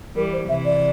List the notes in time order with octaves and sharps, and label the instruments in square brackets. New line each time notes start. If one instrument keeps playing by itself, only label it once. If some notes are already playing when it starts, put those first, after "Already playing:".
[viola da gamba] E3 G3 [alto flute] A#4
[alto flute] C5
[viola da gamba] C3 E3 [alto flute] E5
[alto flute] D5